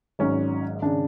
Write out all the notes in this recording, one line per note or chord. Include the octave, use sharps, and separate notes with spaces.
G#1 G#2 F#3 C#4
G#1 C#3 D4